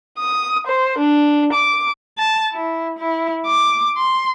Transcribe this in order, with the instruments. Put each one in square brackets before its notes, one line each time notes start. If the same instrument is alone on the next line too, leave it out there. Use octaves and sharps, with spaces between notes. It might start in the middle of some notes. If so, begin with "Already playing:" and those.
[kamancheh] D#6
C5
D4
D6
[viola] A5
E4
E4
D6
C6